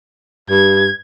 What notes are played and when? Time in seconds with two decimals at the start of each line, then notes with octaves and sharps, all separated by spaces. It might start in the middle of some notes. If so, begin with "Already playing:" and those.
0.50 G2 G#6